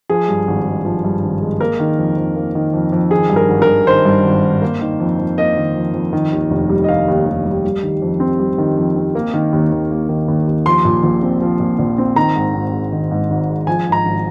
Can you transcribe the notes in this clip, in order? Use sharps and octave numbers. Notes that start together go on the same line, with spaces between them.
F3 G#4
G2
G#1
G#3
F3
G2
G#1
G#3
A#3 A#4
D#3
F2
F2
A#3
D#3
F2
F2
D#3 G#4
G2
A#4
G#1
A#4
G#1
D#3 C5
G2
G#1
G#1
A#3
D#3
F2
F2
A#3 D#5
D#3
F2
F2
D#3
D#2
F1
G3
D#5
D#3 F5
D#2
F1
G3
G3
D#3
F2
C4
G3
D#3
F2
C4
A#3
D#3
D#2
D#2
A#3
D#3
D#2
D#2
F3 C6
A#2
A#1
C4
F3
A#2
A#1
C4
D#3 A#5
G#2
G#1
G#3
D#3
G#2
G#1
G#3
F3 G#5
G#2
A#5
G#1